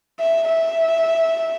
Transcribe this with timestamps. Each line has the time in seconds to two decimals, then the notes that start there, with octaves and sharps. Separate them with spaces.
0.20 E5
0.48 E5